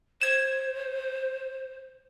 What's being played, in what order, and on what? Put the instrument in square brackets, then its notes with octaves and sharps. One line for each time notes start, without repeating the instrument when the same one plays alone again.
[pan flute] C5 [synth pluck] G#6 E7